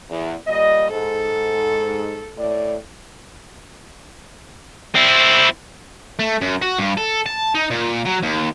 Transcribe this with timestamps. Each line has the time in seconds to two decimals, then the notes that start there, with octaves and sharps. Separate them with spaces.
0.10 E2
0.47 A#2 G3 D#5
0.90 G#2 A4
2.37 A2 D5
4.95 C4 E4
6.19 A3
6.41 F#2
6.62 F#4
6.78 G2
6.98 A4
7.26 A5
7.55 D#4
7.70 A#2
8.06 F#3
8.23 D#2